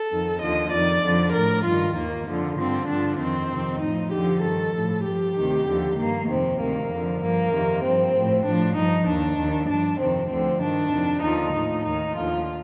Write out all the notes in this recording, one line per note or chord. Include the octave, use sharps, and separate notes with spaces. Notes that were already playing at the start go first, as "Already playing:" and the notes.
Already playing: A4
F2 D#3
D#2 D3 F3 D#5
F2 D#3 D5
F2 D3 F3
A2 F3 A#4
G2 D#3 F4
D#2 D#3 A#3
F2 D3 F3
G2 D3 F3 C4
G2 D3 F3 D4
F2 D#3 C4
F2 C3 D#3
A2 F3 D#4
F2 D3 F3 G4
G2 D#3 A4
A2 F3
G2 F3 G4
D2 C3 D#3
D#2 D3 F3
G2 D#3 A#3
F2 C3 D#3 C4
D2 C3 D#3 A#3
F2 D3 F3
G2 F3 A#3
F2 C3 D#3
G2 F3 C4
A2 F3
A2 F3 D4
G2 F3 D#4
D#2 D#3 D4
D#2 D#3
G2 F3 D4
F2 C3 D#3 C4
D2 D3 F3 C4
G2 D#3 D4
F2 C3 D#3
D#2 D3 F3 D#4
A2 F3
D#2 D#3 D#4
D#2 D3 F3 F4